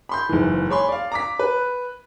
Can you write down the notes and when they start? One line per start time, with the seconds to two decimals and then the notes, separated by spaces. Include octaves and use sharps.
0.09 B5 C6 G6
0.29 F#1 G#2 E3
0.70 G#4 C#5 B5 C6
0.89 D5 F5
1.12 A#5 D6 B6
1.39 B4